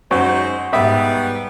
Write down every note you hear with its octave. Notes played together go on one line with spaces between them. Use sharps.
F#2 G#3 D#4 C5 F#5 C#6
G#2 G3 B3 B4 E5 D#6